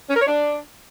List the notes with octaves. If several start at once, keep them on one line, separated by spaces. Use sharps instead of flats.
C#4
A#4
C#5
D4